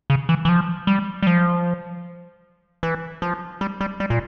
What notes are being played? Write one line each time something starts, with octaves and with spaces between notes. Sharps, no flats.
C#3
E3
E3
F3
G3
G3
F3
E3
F3
G3
G3
G3
A#2